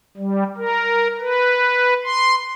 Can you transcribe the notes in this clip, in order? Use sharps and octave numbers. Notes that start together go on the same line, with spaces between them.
G3
A#4
B4
C6